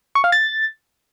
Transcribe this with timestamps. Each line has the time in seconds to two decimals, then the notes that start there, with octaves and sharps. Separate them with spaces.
0.15 C#6
0.24 F5
0.32 A6